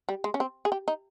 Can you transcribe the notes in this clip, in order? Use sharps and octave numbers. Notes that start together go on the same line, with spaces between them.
G3
G#3
C#4
C4
G#4
G4
D#4